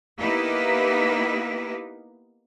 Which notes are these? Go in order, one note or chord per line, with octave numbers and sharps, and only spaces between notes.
A#3 B3 D#4 E4 G4 B4